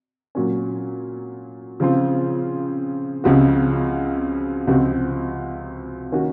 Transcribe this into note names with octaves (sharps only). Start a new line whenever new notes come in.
A#2 F#3 C#4
C#3 F3 C4 F4
C#2 C#3 F3 C4 F#4
C#2 C3 F3 C4 F#4
D#3 A#3 C#4 F#4